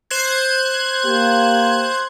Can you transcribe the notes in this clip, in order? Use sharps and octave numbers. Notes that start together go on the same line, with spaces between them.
C5 F#6 G#6
A#3 G4